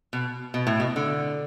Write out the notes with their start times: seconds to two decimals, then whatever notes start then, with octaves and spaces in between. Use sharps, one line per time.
0.13 B2
0.54 B2
0.67 A2
0.80 B2
0.96 D3